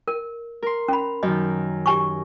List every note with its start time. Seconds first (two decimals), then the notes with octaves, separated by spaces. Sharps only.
0.08 A#4
0.63 A#4 C6
0.88 C#4 B5
1.23 F#2 D#3 D#5
1.86 G4 G#5 C#6